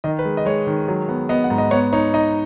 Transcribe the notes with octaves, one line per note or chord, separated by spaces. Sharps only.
D#3 D#5
B4
G#3
D#5
G#3 C#5
D#3
F#3
B3
B3 D#5
F#5
G#2
D#5
B3 C#5
D#4 C#5
D#4 D#5